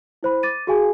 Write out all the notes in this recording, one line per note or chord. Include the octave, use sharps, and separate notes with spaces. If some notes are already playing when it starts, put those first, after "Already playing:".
E4 C5 B5
D6 A6 D#7
F#4 G#4 F5 G#5